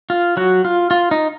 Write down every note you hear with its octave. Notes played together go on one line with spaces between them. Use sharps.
F4
F#3 F#4
F4
F4
D#4